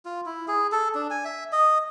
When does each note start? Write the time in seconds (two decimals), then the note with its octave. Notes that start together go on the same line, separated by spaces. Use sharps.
0.05 F4
0.26 E4
0.48 G#4
0.72 A4
0.95 D4
1.10 G#5
1.25 E5
1.52 D#5